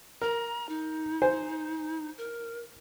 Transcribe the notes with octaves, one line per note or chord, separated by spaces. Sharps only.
A#4 A#5
D#4
C5 G#5
A#4